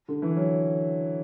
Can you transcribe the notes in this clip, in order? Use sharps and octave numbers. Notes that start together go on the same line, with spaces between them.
D3
E3
F#3